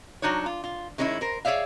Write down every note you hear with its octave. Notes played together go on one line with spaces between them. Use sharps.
F#3 A3 D4 D#4 F#4 C#5
F4
F4
D#3 G#3 C#4 D4 E4
A#4 C5
G#4 C#5 D5 E5 F5